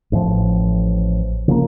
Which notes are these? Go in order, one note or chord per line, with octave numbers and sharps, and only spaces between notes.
A1 A2 F3
C#3 F3 A#3